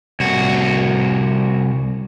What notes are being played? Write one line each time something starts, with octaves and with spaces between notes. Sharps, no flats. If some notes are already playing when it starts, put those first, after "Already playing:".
C2 F#4